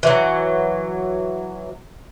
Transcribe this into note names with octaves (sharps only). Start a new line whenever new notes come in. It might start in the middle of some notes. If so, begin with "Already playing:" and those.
E3 F#3